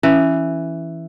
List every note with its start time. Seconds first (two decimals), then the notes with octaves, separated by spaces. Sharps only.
0.03 E3 C#4